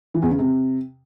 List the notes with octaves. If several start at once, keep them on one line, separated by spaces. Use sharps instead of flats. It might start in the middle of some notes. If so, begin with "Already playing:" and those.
E3
E2
C#3
C3